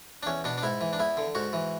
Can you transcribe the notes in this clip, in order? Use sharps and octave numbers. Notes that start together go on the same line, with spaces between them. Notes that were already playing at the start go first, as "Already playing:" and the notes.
D4
E2 C#4
B2 D4
D4
G#2 E4
E3
D4
E2 E4
D3
G#2 F#4
E3